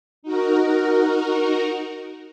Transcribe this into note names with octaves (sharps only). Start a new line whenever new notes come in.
D#4 F#4 A#4